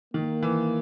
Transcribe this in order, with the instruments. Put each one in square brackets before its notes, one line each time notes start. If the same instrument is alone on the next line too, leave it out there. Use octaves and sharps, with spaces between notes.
[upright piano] D#3 [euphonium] A#3
[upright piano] E3